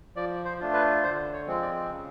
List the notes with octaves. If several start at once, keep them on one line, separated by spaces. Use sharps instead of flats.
F3 D5
C5
A3 D4 F4
B4
D3 C5
C#5
F3 G#3 C4
D5
C#3